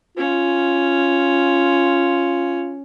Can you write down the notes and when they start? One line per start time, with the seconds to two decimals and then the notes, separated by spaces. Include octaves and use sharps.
0.17 C#4 F4